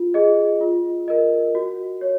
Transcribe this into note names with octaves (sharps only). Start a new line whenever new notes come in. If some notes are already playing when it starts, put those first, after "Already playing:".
Already playing: F4
G#4 D#5
F4
A#4 D#5
F#4
C#5